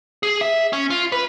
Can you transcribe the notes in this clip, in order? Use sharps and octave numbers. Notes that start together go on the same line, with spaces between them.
G#4
E5
C#4
F4
B4